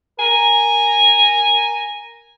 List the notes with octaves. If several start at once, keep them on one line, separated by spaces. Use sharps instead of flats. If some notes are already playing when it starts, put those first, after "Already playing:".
A#4 G#5 A#5